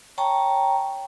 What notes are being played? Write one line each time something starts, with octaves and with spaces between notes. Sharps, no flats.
C#5 G5 A5 A#5 C#6